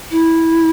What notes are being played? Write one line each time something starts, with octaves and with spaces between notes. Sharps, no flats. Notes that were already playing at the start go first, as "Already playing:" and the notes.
E4